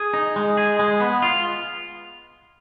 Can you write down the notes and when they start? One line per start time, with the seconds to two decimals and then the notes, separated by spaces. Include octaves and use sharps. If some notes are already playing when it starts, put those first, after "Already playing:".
Already playing: G#4
0.14 D#4
0.36 G#3
0.57 G#4
0.79 G#3
1.00 B3
1.22 F4